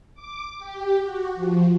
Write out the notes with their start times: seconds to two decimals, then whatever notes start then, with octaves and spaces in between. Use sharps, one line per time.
0.15 D6
0.58 G4
1.03 F#4
1.35 F3